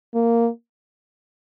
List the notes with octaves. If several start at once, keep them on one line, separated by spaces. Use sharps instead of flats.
A#3